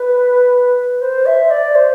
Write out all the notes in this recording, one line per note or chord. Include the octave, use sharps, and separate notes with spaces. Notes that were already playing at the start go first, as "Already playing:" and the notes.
Already playing: B4
C5
E5
D5
C5